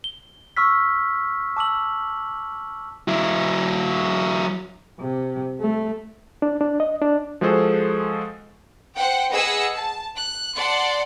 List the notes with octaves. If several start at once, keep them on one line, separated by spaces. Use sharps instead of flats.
G7
C#6 E6 F6 B6
A5 D6 E6 F#7
F#3 E4
C3
A3
D4
D4
D#5
D4
F3 G#3 F#4 G#4 A4 C5
C5 F#5 G5
G#4 B4 D#5 F#5 G#5 E6
A5
F#6
D5 F#5 A5 C6